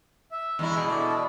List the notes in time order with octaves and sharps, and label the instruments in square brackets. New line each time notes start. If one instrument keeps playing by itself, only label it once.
[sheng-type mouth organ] E5
[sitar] E2 G#3 E4
[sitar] B2 [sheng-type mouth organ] G#4
[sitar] B2 [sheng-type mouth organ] D4 E4 A4